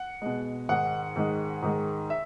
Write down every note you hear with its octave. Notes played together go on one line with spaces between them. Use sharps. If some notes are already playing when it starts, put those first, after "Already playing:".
Already playing: F#5
B2 G#3
G#2 D#3 G#3 F#5
G#2 D#3 G#3
G#2 D#3 G#3
E5